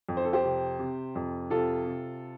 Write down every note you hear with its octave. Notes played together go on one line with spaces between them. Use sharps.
F2
C5
A4
G4 C5
C3
C3
F2
C3 F4 A4
C3